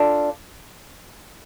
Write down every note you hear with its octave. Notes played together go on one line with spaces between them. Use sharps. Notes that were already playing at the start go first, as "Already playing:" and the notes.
Already playing: D4 F4 A4 D5